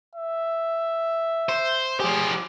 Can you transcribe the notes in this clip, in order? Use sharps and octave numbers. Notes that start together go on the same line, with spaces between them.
E5
C5
F3 G4 G#4